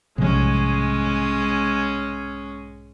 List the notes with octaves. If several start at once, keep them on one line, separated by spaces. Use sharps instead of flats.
B1 G#2 C3 F3 G3 G#3 C#4